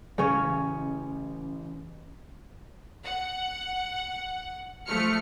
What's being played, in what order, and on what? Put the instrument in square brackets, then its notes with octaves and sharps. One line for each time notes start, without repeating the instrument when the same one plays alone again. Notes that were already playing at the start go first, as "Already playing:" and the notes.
[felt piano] A1 [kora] C#3 C#4 C#5
[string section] F#5
F3 A3 F6 C#7